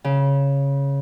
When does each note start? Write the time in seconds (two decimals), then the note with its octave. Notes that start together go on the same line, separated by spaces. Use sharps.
0.04 C#3